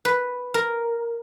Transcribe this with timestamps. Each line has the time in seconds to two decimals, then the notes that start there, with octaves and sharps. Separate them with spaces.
0.05 B4
0.54 A#4